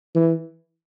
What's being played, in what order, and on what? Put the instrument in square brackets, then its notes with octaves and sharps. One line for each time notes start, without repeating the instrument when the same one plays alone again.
[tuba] E3